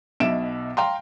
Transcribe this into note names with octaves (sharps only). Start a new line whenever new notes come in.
B1 B2 E5 D7 E7
F5 G5 A#5 C6